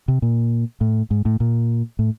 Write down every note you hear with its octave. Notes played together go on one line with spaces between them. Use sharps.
C3
A#2
A2
G#2
A2
A#2
A2